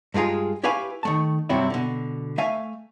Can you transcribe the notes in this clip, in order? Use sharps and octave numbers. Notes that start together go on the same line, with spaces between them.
G2 G#3 F4 G#4 A#5
E4 G4 B4 C#5 F5 G#5
D#3 A3 A5
G2 C3 F#3 G3 C4 E4
B2 D3
A3 E5 F5 G#5